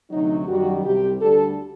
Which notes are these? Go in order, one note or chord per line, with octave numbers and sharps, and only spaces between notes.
D2 C3 F#3 D#4
F#2 D#3 G3 F#4
C2 C3 G3 G4
D2 D3 G3 A4